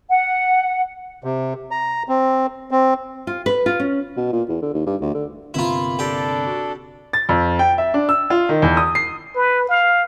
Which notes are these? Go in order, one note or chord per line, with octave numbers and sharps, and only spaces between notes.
F#5
C3
A#5
C4
C4
F4
B4
F4
C#4
B2
A#2
E2
D3
D#2
G2
D2
D3
G1 C3 A#3 E4 F4 A#5 B5
D4 G4 A4
F#4
A6
F2
G5
E5
D4
E6
F4
D#3
E2
D#6
C7
B4
F5